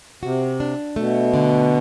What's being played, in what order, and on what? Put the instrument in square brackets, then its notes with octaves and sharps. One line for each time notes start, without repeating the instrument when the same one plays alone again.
[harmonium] C3 [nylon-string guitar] F#4
[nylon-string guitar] D4
[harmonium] B2 [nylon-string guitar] A3
[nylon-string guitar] D3